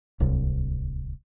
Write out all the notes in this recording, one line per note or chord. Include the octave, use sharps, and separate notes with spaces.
D1 C2